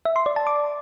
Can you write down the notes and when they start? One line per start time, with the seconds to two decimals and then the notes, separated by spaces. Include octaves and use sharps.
0.05 E5
0.16 C6
0.26 D5
0.36 A5
0.47 D6